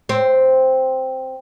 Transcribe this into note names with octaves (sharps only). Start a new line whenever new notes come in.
C4